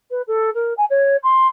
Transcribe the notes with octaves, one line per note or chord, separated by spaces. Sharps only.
B4
A4
A#4
G#5
C#5
C6